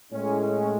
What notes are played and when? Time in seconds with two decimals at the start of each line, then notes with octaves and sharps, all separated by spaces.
0.12 A2 G#3 C#4
0.40 C#4